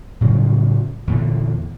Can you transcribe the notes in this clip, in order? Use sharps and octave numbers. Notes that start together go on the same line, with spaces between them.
A2 C#3 F#3 G3
E2 A#2 D3